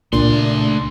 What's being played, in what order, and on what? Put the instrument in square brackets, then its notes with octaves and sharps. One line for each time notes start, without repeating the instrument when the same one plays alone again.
[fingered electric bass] C#2 [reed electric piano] A#2 [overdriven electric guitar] A3 C6 [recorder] D4